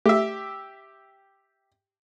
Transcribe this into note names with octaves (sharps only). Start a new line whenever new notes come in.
A3 G4 E5